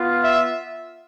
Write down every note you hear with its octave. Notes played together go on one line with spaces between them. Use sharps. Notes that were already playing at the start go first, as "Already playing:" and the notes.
Already playing: B3 F4
E5